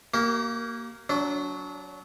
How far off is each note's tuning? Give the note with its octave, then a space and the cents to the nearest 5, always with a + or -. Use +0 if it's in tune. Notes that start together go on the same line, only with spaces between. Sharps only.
A#3 +0 G4 -45
F#3 +0 D4 -30